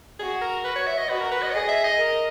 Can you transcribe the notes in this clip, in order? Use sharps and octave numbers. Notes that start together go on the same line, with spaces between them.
F#4 G#4
A#4
B4
C#5
E5
D#5
F#4 B4
A#4
B4
D#5
C#5
G#4 D#5
E5
D#5
A#4